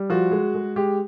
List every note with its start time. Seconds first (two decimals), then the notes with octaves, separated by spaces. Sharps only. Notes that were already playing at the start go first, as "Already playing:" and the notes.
Already playing: G3
0.10 F3 F#4
0.31 G#3
0.54 G#3
0.76 G#3 G4